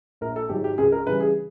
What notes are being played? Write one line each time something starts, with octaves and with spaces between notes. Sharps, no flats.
A#1 A#4
A4
G#2 D#3 F#3 G4
G4
C#2 G#4
A#4
C#3 E3 G3 B4
G#4